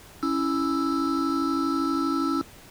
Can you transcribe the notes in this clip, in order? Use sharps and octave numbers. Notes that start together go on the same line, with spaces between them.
C#4 E4 E6